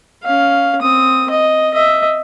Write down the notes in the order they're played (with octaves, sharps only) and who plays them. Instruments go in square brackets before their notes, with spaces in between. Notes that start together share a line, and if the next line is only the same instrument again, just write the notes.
[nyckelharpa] C#4 F5
C4 D#6
D#5
D#5 E5